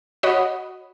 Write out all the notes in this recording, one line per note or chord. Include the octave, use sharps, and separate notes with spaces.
F#4 C#5 D#5 F#5 B5 D#6